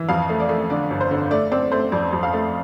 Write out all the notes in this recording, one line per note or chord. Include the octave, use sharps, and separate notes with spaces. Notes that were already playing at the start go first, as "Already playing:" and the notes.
Already playing: E3
F2 F5
A3
D5
A3
D3 D5
G1
C5
D3
A3 D5
C4 D5
A3 C5
F2 D5
F2
F5
A3